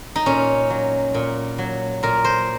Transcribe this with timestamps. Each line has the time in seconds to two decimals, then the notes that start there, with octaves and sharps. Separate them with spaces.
0.16 D#4
0.26 A#2 C#4
0.70 F#3
1.14 A#2
1.58 F#3
2.03 A#2 A#4
2.24 C5